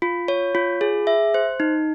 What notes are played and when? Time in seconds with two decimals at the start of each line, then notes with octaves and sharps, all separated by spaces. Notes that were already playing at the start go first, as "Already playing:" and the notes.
0.02 F4
0.28 C#5
0.55 F4
0.81 G#4
1.07 E5
1.34 C5
1.60 D#4